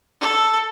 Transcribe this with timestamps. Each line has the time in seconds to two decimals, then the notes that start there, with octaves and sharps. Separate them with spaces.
0.21 A4